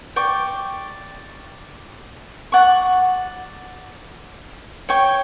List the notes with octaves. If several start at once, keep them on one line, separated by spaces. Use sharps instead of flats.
D5 G5 C#6
D5 F#5 C#6
C#5 G5 C#6